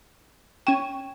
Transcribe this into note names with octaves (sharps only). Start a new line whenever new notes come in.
C#4 G5 C#6 D#7 E7